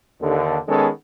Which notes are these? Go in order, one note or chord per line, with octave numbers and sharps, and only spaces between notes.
D#2 D3
D#3 G#3 B3 C#4 A4